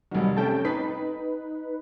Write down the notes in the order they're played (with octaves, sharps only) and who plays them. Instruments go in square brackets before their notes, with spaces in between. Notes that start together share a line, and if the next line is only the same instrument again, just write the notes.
[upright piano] F1 D#3 [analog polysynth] F#3 G3
[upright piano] C3 A3 [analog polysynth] C#4 G5 A5
[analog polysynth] D#4 B4 [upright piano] B6